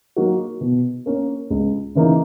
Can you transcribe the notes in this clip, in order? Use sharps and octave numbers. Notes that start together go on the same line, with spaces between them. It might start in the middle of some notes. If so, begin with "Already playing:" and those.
F#3 A#3 D#4 F#4
B2
A#3 C#4
C#2
C#3 E3 A#3 D#4